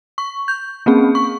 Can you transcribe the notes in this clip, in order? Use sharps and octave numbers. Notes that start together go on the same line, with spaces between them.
C#6
G6
A#3 C4 C#4 G#4
C#6